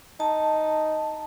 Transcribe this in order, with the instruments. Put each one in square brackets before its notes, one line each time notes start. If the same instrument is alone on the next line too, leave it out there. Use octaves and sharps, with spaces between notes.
[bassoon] D#4 [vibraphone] A5